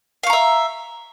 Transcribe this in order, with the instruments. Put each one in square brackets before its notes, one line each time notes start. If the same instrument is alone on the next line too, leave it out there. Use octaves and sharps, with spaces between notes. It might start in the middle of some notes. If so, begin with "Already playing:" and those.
[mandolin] F5
C#6
A#5
E5